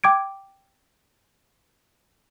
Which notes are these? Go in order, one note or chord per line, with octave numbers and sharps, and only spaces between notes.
G5 D6 G#6 D7